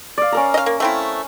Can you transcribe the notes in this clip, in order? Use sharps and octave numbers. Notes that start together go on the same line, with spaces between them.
D5 F5
C#4 A#4 A#5
D#5 F5
A#3
A3 C4 E4